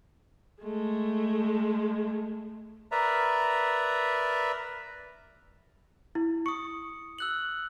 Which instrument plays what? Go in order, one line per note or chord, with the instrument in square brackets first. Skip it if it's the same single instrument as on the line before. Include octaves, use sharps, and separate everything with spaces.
[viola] G#3 A3
[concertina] A#4 B4 D5 E5 A#5
[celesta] E4
[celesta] C#6 [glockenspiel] D#6 C#7
[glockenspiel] E6 F#6 F#7